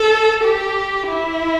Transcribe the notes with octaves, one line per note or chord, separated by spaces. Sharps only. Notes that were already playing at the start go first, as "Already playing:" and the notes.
Already playing: A4
G4
E4